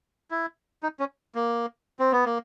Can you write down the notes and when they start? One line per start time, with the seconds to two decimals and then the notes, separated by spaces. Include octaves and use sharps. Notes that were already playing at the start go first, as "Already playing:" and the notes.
0.31 E4
0.83 D#4
0.99 C#4
1.35 A#3
1.99 C4
2.12 B3
2.25 A#3